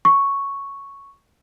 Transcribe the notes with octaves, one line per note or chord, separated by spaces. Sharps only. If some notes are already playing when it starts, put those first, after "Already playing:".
C#6